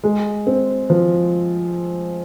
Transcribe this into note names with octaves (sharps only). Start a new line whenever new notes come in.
G#3
C4
F3